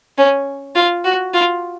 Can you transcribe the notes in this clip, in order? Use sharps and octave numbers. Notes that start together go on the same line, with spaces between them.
C#4
F4
F#4
F4